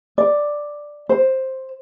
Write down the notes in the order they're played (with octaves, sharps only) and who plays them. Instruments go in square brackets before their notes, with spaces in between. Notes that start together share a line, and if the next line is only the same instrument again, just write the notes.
[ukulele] D5
C5